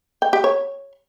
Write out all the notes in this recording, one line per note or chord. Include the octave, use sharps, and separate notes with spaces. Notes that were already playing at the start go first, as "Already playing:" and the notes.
G5
G4
C#5